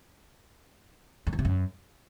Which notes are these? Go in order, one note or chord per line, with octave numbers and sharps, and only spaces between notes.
F2
E2
C3
F#2